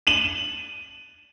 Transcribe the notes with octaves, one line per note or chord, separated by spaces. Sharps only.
D#7 E7 F#7